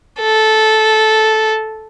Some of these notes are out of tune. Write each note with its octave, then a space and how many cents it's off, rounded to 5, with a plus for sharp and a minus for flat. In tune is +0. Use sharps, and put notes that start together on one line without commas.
A4 -10